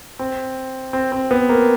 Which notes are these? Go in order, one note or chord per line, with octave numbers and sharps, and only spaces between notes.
C4
C4
C4
B3
A#3